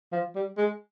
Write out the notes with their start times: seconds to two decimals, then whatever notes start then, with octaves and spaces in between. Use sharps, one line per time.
0.12 F3
0.35 G3
0.58 G#3